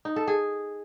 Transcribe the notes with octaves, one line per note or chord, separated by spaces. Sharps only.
D#4
A4
G#4